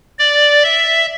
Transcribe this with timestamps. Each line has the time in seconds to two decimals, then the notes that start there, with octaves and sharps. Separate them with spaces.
0.19 D5
0.64 E5